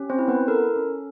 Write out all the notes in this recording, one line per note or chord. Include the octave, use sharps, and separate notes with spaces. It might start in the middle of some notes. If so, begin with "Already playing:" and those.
Already playing: C#4 G4
C4 C5
E4
B3 B4
A4 A#4
C#4